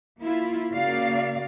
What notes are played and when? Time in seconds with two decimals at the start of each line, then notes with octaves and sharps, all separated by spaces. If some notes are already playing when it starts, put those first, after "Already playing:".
0.20 A#3 E4 F4
0.71 C#3 A#3 F#4 D5 F5